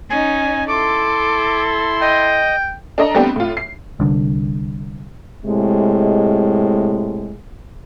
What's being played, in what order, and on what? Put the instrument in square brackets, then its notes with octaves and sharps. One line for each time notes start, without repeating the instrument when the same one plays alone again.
[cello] C#4 D#4 [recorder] G#5
[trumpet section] E4 C6 [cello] A4 [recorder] D6
[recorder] D#5 [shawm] G5
[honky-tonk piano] D4 A4 D#5 A#5
G3 A3 B3 C4 D4 G4
A2 F4
C7
[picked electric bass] C2 D3
[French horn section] A2 C3 G#3